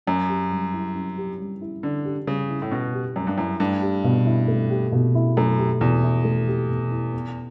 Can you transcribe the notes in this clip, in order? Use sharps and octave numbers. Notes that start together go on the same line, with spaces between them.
F#2 C#4
G4
G3
E4
C#4
G4
G3
E4
D3 C#4
G4
C#3 G3
E4
A2
B2 C#4
G4
F#2 G3
G2
F#2 E4
G2 A3
G4
B2
E4
A3
G4
B2
E4
F#2 A3
G4
E2 B2
E4
A3
G4
B2
E4
B3